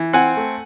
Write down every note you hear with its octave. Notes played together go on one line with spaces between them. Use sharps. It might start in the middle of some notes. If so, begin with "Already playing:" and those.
Already playing: E3
C4 F#5 G#5
A3